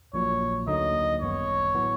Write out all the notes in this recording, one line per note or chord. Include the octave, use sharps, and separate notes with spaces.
A#1 A#2 F#3 C#5
D2 D3 F#3 A#3 D#4 D#5
G#1 F#2 D#3 G3 B3 C#5
A2 F#3 B3 E4